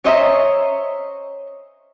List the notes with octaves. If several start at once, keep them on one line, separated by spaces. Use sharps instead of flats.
C#4 C5 C#5 D#5 E5 A#5